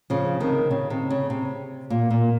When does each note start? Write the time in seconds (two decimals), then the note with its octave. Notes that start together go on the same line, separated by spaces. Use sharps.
0.10 C#3 F3
0.40 C3 D#3
0.71 C#3
0.90 C3
1.10 C#3
1.30 C3
1.90 A#2
2.10 A#2